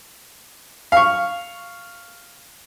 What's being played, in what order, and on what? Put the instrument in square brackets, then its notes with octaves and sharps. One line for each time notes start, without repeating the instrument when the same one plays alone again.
[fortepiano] F5 C#6